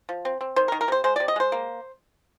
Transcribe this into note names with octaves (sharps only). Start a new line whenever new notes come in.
F3
C4
C4
D#3 C5
A#4
D#3
A#4
C3 C5
G#3 C5
C3 D5
D#5
G#3 C5
A#3